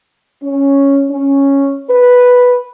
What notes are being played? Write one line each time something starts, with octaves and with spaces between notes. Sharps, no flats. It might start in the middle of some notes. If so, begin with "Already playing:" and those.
C#4
C#4
B4